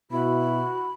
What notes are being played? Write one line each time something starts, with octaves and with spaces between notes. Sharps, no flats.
B2 E4 F#4 B5